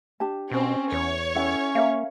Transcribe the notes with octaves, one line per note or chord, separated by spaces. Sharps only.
D4 G4 A5
B2 C4 C#4
E2 C#5
C#4 E4 A4 F#5
A#3 A#4 E5 F5